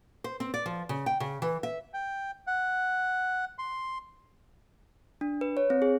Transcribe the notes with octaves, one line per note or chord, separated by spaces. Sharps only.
C5
C4
D5
F3
C#3
G5
C#3
E3
E5
G5
F#5
C6
D4
B4
C#5
C4
G#4